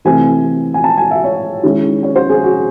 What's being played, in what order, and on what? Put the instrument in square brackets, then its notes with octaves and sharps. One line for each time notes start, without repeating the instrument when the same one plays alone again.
[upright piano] C3 E3 A3 C4 E4 G#5
G#5
A5
G#5
E5
C#5
D#3 G#3 C#4 E4
C#5
C5
G#4
F#4